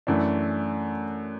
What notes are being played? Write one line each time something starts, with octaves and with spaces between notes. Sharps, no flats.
F#2 E3 A3 D4